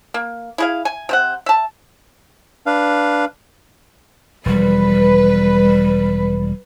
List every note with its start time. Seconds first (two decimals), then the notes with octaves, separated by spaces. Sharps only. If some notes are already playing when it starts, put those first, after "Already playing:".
0.14 A#3
0.58 E4 G#4 F5
0.85 G#5
1.09 C3 C5 F#5
1.46 E5 A5
2.66 D4 B4 F5
4.46 E1 F3 G3 B4